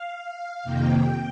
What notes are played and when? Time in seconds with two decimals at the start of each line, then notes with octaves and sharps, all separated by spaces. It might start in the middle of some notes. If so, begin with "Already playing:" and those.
Already playing: F5
0.64 F2 C3 D#3 A#3 G5